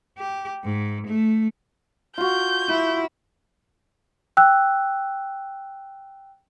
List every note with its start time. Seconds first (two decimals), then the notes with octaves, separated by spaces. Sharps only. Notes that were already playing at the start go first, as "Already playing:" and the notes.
0.18 G4
0.64 G#2
1.07 A3
2.18 F4 F#4 G6
2.69 E4
4.37 G5 E6 F#6